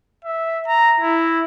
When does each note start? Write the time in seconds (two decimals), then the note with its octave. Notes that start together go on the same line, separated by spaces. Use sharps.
0.24 E5
0.67 A#5
1.00 E4